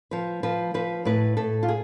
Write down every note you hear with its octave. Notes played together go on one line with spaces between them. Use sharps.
F3 B4
F3 B4
F3 B4
A2 B4
A2 A4
F4
G#4